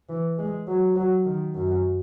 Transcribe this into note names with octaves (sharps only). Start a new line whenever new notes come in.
E3
G#3
F#3
F#3
D#3
F#2